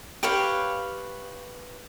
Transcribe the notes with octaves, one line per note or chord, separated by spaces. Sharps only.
G4 B4 C#5 F5